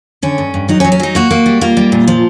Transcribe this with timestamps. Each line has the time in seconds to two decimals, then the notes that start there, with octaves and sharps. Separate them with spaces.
0.23 D3 C#4
0.38 G2
0.54 G2
0.69 F#3 D#4
0.80 C#4
0.84 F#3
0.92 C#4
1.00 F#3 D#4
1.15 A#3 F#4
1.31 A#3
1.46 G3
1.61 A#3 F4
1.77 G3
1.92 A#2
2.08 F3